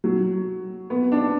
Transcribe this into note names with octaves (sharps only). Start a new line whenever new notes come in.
F#3
B3
D4